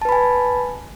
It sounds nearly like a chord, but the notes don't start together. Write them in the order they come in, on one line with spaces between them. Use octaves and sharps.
A5 B4 B5 G#5